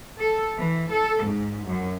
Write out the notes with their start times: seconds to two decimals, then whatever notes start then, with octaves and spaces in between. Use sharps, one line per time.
0.19 A4
0.57 E3
0.90 A4
1.24 G#2
1.66 F#2